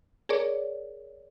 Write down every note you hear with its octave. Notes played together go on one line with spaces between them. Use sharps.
G#4 A#4 C#5 D5